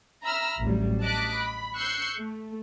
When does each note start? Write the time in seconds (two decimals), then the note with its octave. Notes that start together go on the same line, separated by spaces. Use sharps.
0.23 E5 A#5 B5 E6 F6
0.60 A1 D2 F#3 G3
1.01 D#5 A5 D6 F#6 B6
1.37 B5
1.76 C#6 E6 F#6 G6 C7 C#7
2.18 A3